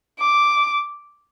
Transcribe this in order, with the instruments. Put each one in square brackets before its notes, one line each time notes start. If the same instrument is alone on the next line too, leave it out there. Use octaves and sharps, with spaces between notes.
[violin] D6